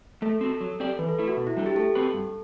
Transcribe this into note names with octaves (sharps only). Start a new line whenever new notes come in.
A3 A4
C4 F#4
F#3
C4 G4 D5
E3 B4
A4
A3 E4
F#4
B2
E4
G3 D4 A4
G4
A3 A4
C4 F#4 B4
G2